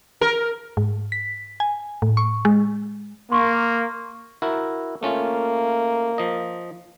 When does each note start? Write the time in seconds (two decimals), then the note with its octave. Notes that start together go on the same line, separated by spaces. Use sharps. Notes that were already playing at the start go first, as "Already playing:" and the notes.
0.21 A#4
0.77 G#2
1.12 B6
1.60 G#5
2.02 A2
2.17 C#6
2.45 G#3
3.32 A#3 C6 C#6
4.42 E4 F#4 A#4
5.03 A3 A#3 C#4 F4
6.18 F3 D#5